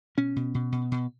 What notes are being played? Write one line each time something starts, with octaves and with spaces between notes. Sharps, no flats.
B2 C#4
B2
B2
B2
B2